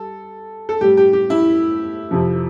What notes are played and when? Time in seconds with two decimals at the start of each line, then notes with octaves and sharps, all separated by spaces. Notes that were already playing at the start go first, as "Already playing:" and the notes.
Already playing: G3 A4
0.69 A4
0.81 A2 G3 G4
0.97 G4
1.13 G4
1.30 E4
2.11 F2 C3 F3